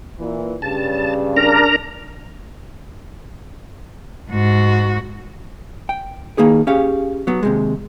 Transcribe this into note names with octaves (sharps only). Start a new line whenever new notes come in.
A#2 E3
G2 C#3 A5
D4 A#4 A#5
G#2 F#4
G5
D#3 A#3 D#4 G#4 B4
C#4 G4 G#4 F5
F#3 B3
D#2 C3 G#3